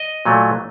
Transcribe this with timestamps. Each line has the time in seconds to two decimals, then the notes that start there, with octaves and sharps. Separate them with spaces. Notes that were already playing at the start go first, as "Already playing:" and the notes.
Already playing: D#5
0.25 A#2 F#3 A3